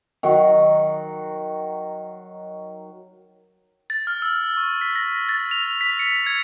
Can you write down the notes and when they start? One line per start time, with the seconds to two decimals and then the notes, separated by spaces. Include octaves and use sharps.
0.23 D#3 F#3 F#4
3.90 A6
4.07 F6
4.22 E6
4.57 C#6
4.81 B6
4.96 A#6
5.29 A6
5.51 F7
5.81 B6
5.99 C#7
6.26 G#6